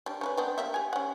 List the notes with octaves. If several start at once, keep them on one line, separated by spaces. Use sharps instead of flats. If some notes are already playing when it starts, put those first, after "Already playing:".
G3 D4
C#4 A#4 B4
B3 C4 D4
G3 A#3 E5
G4 G#5
C#4 F#5